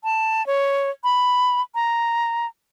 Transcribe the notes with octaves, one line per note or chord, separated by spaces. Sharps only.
A5
C#5
B5
A#5